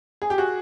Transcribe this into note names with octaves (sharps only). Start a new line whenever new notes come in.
G#4
G4
F#4 G#4